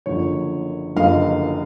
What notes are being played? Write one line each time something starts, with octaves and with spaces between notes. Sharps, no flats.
F#1 F#2 D3 F3 C#5
F#1 F#2 D3 F3 D#5 F5